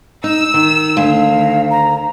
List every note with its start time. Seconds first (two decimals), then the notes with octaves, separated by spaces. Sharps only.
0.24 D#4 E6
0.54 D#3
0.97 D2 F5
1.27 D#3
1.71 A#5